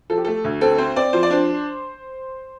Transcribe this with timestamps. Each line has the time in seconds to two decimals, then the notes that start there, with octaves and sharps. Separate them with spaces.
0.10 F3 A4
0.18 G4
0.25 A3 A4
0.44 D2
0.61 C4 A4
0.78 C4 C5
0.96 C4 D5
1.13 F3 C5
1.23 D5
1.31 D4 C5